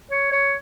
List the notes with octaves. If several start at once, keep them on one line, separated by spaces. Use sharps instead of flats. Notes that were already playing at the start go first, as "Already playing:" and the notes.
C#5
C#5